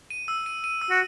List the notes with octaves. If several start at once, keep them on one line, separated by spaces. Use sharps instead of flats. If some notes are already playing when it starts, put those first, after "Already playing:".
D#7
E6
D#7
D#7
E6
F#4